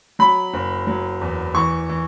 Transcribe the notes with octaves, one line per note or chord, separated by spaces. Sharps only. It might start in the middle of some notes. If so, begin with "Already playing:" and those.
F#3 B5
F#1
F#3
E2
E3 C#6
E3